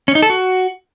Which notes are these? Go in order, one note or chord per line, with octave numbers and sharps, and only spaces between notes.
C#4
D#4
A4
F#4